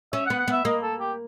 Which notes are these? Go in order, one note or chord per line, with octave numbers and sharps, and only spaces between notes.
C#4 E5
F#5
B3
F#5
B3 E5
A#3 D#5
A4
G4